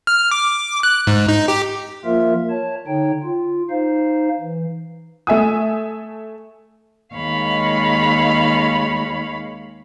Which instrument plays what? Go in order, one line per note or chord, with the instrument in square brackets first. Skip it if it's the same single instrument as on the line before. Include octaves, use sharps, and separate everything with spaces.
[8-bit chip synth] F6
D6
F#6
G#2
D#4
G4
[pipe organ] F3 A#3 F4 A#4 E5
C#5 A5
D3 D#4 C#5 G5
F4
D#4 C5 F5
E3
[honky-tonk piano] A3 E5 G#5 D#6
[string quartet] D#2 G#3 C#5 F5 B5